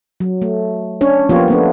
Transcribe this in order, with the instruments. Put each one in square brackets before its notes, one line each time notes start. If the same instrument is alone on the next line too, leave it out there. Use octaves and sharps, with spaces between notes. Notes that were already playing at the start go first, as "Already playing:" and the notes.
[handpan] F#3
A3
C#4 D4 C#5
F3 A#3 B3 F4 G4 C#5
A3 B3 D4